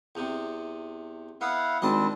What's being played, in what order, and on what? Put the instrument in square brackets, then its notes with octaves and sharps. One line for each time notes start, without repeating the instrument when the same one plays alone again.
[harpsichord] E2 C3
[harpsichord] B3 [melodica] E4 F5 F#5
[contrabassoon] G#1 [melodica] G3 C4 D4 [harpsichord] D#5 A5